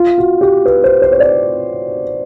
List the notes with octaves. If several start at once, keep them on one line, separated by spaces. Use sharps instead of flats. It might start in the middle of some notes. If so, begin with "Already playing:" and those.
Already playing: F4
F#4
G4
B4
C5
C5
C#5
D5